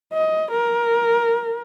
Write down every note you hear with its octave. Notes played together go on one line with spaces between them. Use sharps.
D#5
A#4